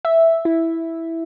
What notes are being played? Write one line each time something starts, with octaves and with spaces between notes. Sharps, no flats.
E5
E4